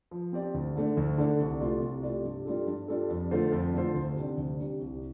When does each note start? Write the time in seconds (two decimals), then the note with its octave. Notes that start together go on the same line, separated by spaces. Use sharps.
0.11 F3
0.32 C4 G4 D5
0.54 D2
0.75 D3 A3 D4
0.97 D2
1.18 D3 A3 D4
1.40 C2
1.61 C3 A3 F4 D5
1.82 C2
2.03 C3 A3 F4 D5
2.24 G2
2.45 G3 D4 F4 A4
2.67 G2
2.88 G3 D4 F4 A4
3.10 F2
3.31 D3 A3 F4 C5
3.52 F2
3.73 D3 A3 F4 C5
3.94 D2
4.16 C3 G3 D4
4.37 D2
4.59 C3 G3 D4
4.80 C2